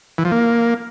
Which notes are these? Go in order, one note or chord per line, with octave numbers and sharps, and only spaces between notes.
E3
F3
A#3